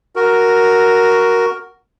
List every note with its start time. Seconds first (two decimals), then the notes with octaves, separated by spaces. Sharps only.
0.16 F#4 A#4